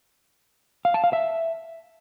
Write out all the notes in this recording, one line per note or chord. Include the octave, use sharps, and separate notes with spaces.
F5
A5
F5
E5